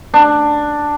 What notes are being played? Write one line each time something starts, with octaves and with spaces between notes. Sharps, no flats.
D4